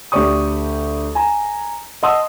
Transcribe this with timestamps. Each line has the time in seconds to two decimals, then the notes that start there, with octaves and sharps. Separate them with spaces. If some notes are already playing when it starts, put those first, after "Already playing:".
0.12 D2 G4 D5 C#6 D#6
1.15 G#5 A#5
2.03 D#5 F#5 A5 C6 D#6 E6